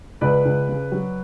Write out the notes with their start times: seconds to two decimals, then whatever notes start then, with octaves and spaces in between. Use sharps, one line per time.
0.21 C#2 B4 D5
0.45 C#2
0.69 C#3
0.92 F#3